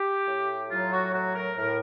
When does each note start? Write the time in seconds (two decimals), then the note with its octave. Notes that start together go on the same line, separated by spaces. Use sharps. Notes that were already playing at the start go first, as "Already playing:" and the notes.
Already playing: G4
0.27 A2
0.70 F#3 F4
0.92 F#4
1.14 A2 F#4
1.35 A#4
1.57 A2 A#4